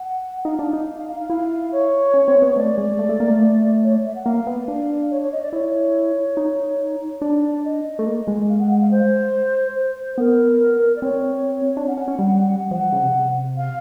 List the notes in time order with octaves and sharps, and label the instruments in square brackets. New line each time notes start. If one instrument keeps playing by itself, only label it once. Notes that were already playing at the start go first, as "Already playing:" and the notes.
Already playing: [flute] F#5
[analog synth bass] D#4 [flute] F5
[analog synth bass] D4
D#4
[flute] F5
F5
F5
[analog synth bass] E4 [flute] F5
[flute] C#5
[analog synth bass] C#4
C4
B3
[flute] C#5
[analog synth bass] A3 [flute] D5
[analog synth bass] G#3
A3
A3
A#3
A3
[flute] C#5
E5
F#5
[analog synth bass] A#3 [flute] F5
[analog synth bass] B3
D4
[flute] C#5
C#5
D#5
D5
[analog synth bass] E4 [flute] C#5
[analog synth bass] D#4
[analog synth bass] D4 [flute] D5
[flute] D#5
[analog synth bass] A3
A#3
G#3
[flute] F5
F#5
F#5
F5
C5
C5
[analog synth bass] B3 [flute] A#4
[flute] D5
[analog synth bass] C4 [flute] C#5
[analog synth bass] D4
[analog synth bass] C#4 [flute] F#5
[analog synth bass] C#4
C#4
G3
[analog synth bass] F3 [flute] F#5
[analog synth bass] C#3
C3
[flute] F5